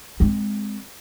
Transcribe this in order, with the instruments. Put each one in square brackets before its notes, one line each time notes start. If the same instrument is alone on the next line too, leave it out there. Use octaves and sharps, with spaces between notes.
[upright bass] G#3 C4